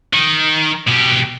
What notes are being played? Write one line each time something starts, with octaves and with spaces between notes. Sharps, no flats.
D#3
B2 G4